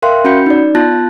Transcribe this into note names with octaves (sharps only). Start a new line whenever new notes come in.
A#4 E5 F5 G5 C6 F#6
C#4 F#4 F#5 B5 G6 C#7
D#4 D5
B3 F4 A5 F#6 A6 A#6